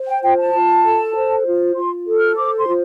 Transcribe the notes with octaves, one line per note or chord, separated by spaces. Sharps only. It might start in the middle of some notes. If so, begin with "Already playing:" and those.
Already playing: C5
G5
F4 G5
A5
F4
A4
C5
F4
F4 C6
A4
F6
C5 D6
C6
F4